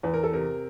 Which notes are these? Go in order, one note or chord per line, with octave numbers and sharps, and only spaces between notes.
E2 B4
A#4
A4
C3 A#4